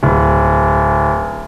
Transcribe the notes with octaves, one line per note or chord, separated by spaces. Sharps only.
D1